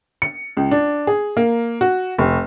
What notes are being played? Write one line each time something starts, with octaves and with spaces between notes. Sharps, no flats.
C#7
C#2
D4
G#4
A#3
F#4
F1